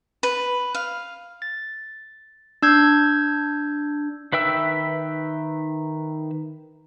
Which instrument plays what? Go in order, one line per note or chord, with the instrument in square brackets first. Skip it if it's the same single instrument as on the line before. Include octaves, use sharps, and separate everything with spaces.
[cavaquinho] B4
F5
[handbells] A6
D4 E6 G6 G#6
[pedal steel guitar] D#3 B4 E5 G5 E6